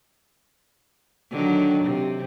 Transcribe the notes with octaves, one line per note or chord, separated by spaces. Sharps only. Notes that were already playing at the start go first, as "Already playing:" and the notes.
D3 D#3 F#3
C3